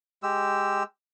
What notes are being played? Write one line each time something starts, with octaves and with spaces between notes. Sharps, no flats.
G#3 G4 E6